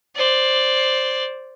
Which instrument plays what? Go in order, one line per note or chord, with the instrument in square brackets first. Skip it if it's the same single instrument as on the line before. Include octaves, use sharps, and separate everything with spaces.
[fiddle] C5 D5